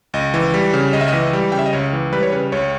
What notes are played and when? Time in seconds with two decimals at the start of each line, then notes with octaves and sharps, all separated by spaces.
0.14 C#2 D#5
0.34 E3
0.54 G3
0.73 C#3
0.93 C#2 D#5
1.01 E5
1.08 D#5
1.13 E3
1.33 G3
1.52 C#3 G5
1.59 E5
1.66 D#5
1.73 C#2 C#5
1.93 E3
2.12 G3 B4
2.23 C#5
2.32 C#3 B4
2.52 C#2 C#5